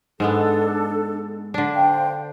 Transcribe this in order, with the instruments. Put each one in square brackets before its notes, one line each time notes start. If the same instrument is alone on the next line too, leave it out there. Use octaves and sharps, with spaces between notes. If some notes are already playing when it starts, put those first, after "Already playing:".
[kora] G#2 G#3 B3 [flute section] D4 A4
[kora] D3 D4
[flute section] C5 F5 G5